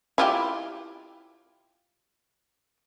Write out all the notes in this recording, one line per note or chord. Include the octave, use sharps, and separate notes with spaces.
E4 F4 G4